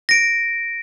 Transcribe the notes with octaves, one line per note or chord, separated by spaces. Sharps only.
A#6 D7